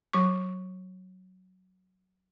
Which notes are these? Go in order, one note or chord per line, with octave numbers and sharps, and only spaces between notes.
F#3 C#6